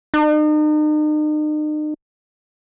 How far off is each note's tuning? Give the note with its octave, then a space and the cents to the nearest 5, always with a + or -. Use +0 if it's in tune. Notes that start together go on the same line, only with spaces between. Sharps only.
D#4 -40